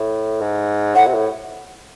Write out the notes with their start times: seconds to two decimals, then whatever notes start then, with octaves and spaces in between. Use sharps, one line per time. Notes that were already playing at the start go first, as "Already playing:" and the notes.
Already playing: A2
0.41 G#2
0.95 A2 F#5
1.07 C3
1.14 A2